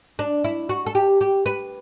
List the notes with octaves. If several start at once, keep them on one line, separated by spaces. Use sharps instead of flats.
D4
E4
F#4
A4
G4
G4
B4